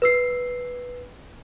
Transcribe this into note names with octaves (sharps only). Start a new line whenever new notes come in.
B4 E6 C7